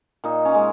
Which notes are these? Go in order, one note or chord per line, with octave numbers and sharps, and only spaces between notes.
A#2 D#4
C#4
G#3